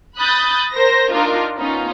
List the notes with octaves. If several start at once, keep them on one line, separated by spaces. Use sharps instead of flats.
B5 D#6 F#6 G6 A6
A#4 C5 A#6
D4 D#4 F4 A#4
B3 C#4 D#4 F4